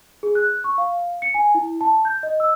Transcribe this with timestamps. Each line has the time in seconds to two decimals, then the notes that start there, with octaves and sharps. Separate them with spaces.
0.23 G#4
0.35 F#6
0.64 C#6
0.78 F5
1.22 C#7
1.34 G#5
1.55 E4
1.81 A5
2.05 G6
2.23 D#5
2.40 E6